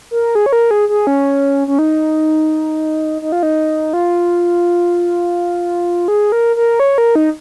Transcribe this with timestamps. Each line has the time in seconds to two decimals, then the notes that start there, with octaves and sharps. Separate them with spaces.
0.11 A#4
0.35 G#4
0.46 C#5
0.53 A#4
0.71 G#4
0.89 G#4
1.07 C#4
1.68 C#4
1.79 D#4
3.22 D#4
3.32 F4
3.43 D#4
3.93 F4
6.08 G#4
6.32 A#4
6.56 A#4
6.80 C#5
6.98 A#4
7.15 D#4